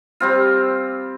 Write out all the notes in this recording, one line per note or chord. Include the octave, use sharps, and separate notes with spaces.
G3 C4 F4